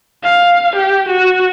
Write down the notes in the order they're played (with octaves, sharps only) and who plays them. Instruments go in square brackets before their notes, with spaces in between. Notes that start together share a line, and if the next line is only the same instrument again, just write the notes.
[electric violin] F5
G4
F#4